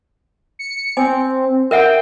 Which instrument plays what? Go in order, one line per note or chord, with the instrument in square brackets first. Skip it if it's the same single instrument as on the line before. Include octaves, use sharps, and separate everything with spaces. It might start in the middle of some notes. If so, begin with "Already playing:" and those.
[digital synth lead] C#7
[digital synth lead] C4 [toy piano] G#5
[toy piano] A#4 E5 F#5 [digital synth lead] G5